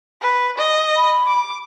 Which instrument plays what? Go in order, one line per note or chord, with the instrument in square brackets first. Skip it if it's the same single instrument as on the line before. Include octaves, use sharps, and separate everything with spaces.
[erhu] B4
D#5
[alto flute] B5
[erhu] D6